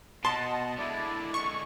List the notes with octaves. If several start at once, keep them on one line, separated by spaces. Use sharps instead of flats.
B2 D#5 F#5 A5 C6
D3 G#3 E4 D5
C#6